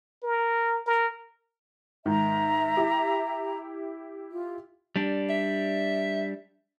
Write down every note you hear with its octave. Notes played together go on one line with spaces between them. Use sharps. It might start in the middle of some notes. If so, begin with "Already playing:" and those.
A#4
A#4
G#2 D#3 E5 A#5
E4 G4
F4
G3 D4
E5